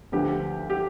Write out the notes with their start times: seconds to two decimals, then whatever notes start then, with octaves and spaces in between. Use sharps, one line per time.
0.12 D2 D3 F3 B3 G4
0.70 G4